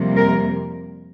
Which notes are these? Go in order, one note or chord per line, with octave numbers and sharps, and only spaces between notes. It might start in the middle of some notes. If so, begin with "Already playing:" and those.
Already playing: F2 C3 G3 A#3
A#4